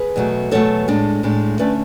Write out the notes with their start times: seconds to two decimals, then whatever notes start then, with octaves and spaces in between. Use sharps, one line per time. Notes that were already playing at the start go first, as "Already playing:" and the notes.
Already playing: G#4 B4
0.16 E2 B2 F#3 A3
0.51 E2 B2 F#3 A3 A4 C#5
0.88 A2 G#3 D4
1.23 A2 G#3 D4
1.59 D3 A3 C#4 B4 D5